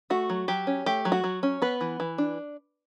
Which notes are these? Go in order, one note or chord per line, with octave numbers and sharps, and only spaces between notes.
A3 F#4
F#3
F#3 G4
C#4
A3 G4
F#3
F#4
F#3
C#4
B3 B4
E3
E3
D4